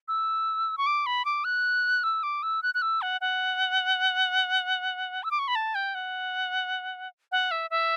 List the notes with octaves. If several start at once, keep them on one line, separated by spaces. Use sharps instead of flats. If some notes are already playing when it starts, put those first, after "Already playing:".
E6
C#6
D6
B5
D6
F#6
E6
D6
E6
F#6
F#6
E6
F#5
F#5
E6
D6
C#6
B5
A5
G5
F#5
F#5
E5
E5